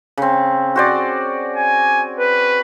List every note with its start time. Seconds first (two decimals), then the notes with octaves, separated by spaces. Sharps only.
0.18 C#3 C4
0.76 F#4 C5 D5
1.56 G#5
2.20 B4